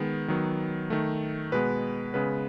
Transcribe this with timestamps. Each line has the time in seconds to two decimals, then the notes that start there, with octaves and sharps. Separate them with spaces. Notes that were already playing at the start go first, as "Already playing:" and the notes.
Already playing: D#3 G#3 B3
0.28 D#3 F#3 B3
0.90 D#3 A3
1.52 B2 G#3 B3 B4
2.14 C#3 G#3 B3 B4